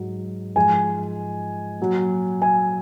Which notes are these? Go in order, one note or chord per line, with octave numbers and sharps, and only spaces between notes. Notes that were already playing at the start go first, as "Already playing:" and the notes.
Already playing: G#2 F#3
G#2 F3 G#3 G#5
A#2 F#3
G#5